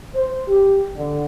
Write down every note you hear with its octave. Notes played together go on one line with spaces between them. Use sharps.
C5
G4
D3